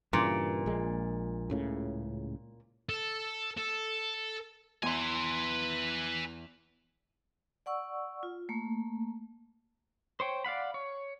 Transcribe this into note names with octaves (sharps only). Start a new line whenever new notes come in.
G2 A#2 C#3 E3
A#1 G#3
C#2 A2 C#3
A4
A4
E2 B4 G#5 C6
D5 F#5 C#6 E6
F4
A3 A#3
C5 C#5 G5
D5 F5 F#5 B5
C#5